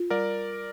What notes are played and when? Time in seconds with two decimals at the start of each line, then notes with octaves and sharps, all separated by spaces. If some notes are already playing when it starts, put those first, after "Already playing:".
Already playing: F4
0.10 G3 A#4 D5